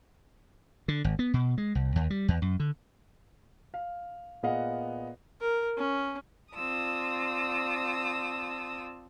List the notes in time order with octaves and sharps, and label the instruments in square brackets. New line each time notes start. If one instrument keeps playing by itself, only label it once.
[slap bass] D3
G#1
B3
B2
G#3
C2
D#2
G3
E2
F#2
D3
[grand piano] F5
A#2 B3 G#4 D#5 F5 F#5
[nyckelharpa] A#4
C#4
[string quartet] C4 F4 D5 A5 D#6 E6